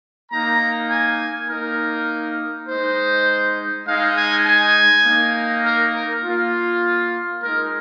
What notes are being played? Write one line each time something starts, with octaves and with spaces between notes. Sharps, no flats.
A#3 D#4 A#5
G#5
A#3 D#4 A#4
G#3 D#4 C5
G#3 D#4 F5
G#5
G#5
A#3 D#4
A#4
A#4
A#3 F4
G#3 D#4 A#4